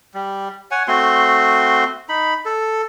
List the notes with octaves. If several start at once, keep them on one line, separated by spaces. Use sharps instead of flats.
G3
C#5 F#5 G#5
A3 C4 F#4 C6
D#4 B5
A4